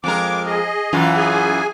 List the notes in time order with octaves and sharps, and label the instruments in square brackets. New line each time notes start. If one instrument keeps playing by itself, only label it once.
[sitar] F2 G#3 A#4 [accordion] D6
[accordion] G#4 D#5
[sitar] F#2 E3 F4
[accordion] G#4 G#5